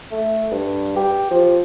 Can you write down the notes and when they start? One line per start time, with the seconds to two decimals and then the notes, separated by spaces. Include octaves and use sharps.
0.11 A3
0.51 G2
0.96 G4
1.31 F3